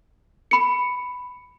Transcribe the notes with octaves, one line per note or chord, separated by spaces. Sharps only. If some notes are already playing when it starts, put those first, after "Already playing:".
B5 C#7